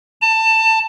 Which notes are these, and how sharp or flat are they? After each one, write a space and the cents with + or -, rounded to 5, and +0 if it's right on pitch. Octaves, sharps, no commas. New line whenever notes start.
A5 +20